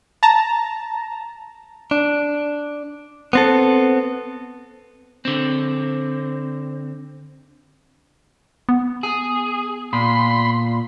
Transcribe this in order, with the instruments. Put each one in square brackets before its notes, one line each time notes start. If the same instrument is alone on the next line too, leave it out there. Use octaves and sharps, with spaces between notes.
[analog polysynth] A5 A#5
[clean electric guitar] D4
B3 C4 A4
D3 C4
[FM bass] B3
[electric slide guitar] G#4
[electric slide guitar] A#2 [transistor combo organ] B5 C6